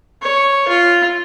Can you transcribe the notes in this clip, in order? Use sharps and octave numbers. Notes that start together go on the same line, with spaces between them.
C#5
F4